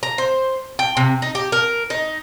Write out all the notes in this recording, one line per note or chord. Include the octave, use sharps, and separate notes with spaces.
A#5
C5
G5
C3
D#4
G4
A#4
D#4